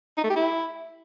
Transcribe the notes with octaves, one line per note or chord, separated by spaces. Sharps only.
D#4
A3
G4
E4